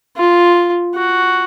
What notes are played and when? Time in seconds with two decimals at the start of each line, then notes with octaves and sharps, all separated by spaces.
0.17 F4
0.95 F#4